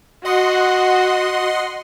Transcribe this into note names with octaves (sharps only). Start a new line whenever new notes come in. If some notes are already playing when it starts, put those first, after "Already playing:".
F#4 D#5 F#5 C6